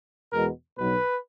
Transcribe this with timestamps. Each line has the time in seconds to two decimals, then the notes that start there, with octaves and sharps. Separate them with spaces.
0.33 E2 B2 G#3 A#4
0.78 B1 B2 F#3 B4